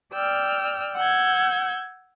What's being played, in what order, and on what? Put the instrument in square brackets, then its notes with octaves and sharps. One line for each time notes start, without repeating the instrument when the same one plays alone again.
[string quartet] D5 G5 E6 F6
F#5 E6 G6 G#6